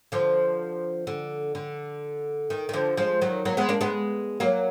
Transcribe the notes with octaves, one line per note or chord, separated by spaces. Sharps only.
D3 F3
D3
D3
D#3
D#3
D3 F3
F3 G#3
D#3 F#3
F#3 A#3
G#3 B3
A#3 D4
G#3 B3
F#3 A#3